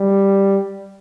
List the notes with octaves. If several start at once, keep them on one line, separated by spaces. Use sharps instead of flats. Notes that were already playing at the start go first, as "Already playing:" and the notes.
Already playing: G3